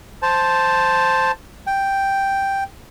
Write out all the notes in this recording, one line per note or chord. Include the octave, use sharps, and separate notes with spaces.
C5 A5
G5